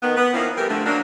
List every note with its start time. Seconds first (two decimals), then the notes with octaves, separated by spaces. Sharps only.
0.02 D#3 B3
0.16 B3
0.34 D#3 F3 A#3 C4 C#4 E4
0.57 E3 G3 A3 C4 G4 A#4
0.69 D3 F3 A3
0.85 F#3 A#3 D4